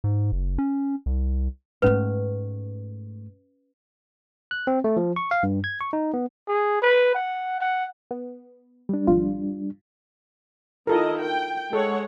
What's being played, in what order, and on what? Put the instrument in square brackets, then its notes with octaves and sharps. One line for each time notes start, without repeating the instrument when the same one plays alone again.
[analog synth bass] G#2
F#1
C#4
C2
[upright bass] G#2 A3 [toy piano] C#4 B4
[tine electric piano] F#6
C4
A3
F3
C#6
F5
G2
G#6
C#6
D#4
B3
[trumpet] G#4
B4
F#5
F#5
[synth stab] B3
[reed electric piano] G3 D4
[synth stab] G#1 F2 F4
[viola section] D#3 E4 D#5 [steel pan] F4 A4 A#4
[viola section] G5
[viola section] G#3 C#5 F#5 [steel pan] A4